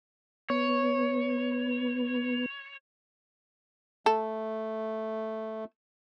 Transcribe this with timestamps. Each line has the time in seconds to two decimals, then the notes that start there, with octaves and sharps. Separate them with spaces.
0.50 B3 C#5
4.06 A3 A4